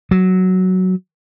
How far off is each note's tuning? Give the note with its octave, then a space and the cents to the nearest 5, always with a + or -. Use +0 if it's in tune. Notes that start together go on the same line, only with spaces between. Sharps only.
F#3 +5